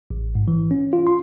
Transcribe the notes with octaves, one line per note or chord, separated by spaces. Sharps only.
A1
G#2
E3
C#4
F4
C6